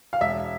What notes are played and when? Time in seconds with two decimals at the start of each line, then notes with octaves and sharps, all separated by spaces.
0.13 F5
0.21 E1 E5